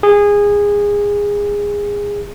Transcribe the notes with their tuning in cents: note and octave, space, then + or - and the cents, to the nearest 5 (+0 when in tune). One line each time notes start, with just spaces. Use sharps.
G#4 -20